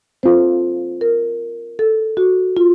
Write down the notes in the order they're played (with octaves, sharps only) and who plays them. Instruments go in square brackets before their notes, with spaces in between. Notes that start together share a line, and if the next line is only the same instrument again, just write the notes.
[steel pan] C4 F4 A4 [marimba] C5
[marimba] A#4
A4
F#4
F4